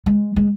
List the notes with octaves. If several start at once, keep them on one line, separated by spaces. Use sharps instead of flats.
G#3
G#3